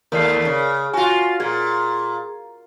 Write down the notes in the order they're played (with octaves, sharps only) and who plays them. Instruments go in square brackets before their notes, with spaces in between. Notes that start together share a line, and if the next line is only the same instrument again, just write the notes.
[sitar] D#2 A3 [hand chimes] A#4 D5 C7
[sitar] C#3
[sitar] F4 F#4 [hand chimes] G#5
[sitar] A#2 [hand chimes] G#4 G#6